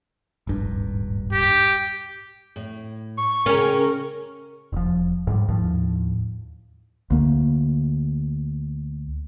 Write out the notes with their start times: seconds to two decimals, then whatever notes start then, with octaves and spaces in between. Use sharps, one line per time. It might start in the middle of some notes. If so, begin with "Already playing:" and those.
0.47 D#1 G#1 G2
1.32 G4
2.56 A2
3.18 C#6
3.46 C#3 C#4 A#4 G5 A#5
4.72 E1 F3
5.27 G#2 G3
5.48 D#2 A2 F3
7.10 D2 A#3